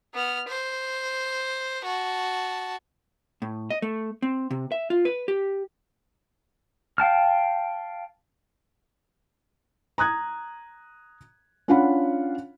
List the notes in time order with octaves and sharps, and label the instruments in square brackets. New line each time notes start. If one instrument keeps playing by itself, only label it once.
[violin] B3 F6
C5
F#4 A5
[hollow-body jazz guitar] A2
D#5
A3
C4
C3
E5
F4
B4
G4
[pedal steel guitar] F5 G5 A5 F6
[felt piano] A#5 D#6 F#6 G#6
C#4 D4 F4 F5 F#5 B5